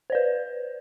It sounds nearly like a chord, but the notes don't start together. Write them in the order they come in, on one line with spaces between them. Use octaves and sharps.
C5 D5 B4